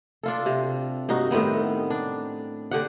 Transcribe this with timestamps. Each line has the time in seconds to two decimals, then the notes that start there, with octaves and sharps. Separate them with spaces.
0.23 D4 F4 A4
0.46 C3
1.09 G2 D#4 F#4
1.31 A2 D#3 B3 C4
1.90 D4
2.71 D3 G4 F#5